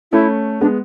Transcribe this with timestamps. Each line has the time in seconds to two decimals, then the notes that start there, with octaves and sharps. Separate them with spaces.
0.12 A3 C#4 E4
0.61 G#3 B3 D4